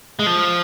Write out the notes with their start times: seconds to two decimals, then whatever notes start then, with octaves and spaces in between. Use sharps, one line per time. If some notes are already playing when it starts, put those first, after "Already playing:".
0.19 G#3
0.26 F3